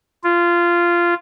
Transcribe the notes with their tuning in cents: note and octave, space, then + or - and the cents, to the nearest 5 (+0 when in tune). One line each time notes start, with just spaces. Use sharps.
F4 -15